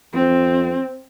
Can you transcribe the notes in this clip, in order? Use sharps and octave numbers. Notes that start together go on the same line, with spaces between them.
F2 C4